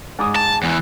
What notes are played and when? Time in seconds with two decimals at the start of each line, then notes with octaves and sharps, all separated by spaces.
0.19 G#2 D6 D#6
0.36 A5
0.63 E2 E3